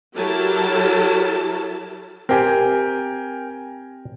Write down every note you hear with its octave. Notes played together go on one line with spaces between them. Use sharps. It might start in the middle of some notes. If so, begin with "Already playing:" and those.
F#3 E4 G4 A4 A#4 A5
C4 G4 A#4 G5 G#5